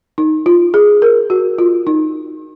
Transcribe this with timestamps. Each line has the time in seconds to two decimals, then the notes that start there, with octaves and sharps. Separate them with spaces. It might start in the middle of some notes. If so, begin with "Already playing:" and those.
0.18 D#4
0.46 F4
0.74 G#4
1.02 A#4
1.30 F#4
1.58 F4
1.87 D#4